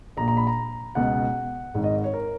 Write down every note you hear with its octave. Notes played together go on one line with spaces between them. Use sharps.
A#1 A#2 A#5
A#5
B5
A#5
C#2 B2 F#5
G#1 G#2 D#3
D#5
C#5
A#4